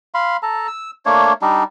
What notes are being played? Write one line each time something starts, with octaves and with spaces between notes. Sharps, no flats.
F5 B5 C6
A4 A5 A#5
E6
A3 A#3 D4 C#5
G3 D4 D#4